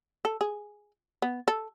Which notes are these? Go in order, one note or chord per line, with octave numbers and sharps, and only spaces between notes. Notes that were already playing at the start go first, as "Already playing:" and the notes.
A4
G#4
B3
A4